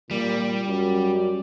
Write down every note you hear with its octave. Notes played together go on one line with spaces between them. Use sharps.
A#2 G3
F#2